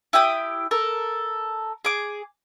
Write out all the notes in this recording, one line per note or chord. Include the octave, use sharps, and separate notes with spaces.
E4 G4 G5 D#6
A4 A#4
G#4 D6